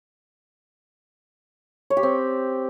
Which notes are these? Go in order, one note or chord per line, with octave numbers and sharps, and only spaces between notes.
C#5
G4
C4